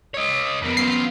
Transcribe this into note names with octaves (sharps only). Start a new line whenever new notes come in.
C#5 D#5
F2 A#3 B3
F#2 F4 C7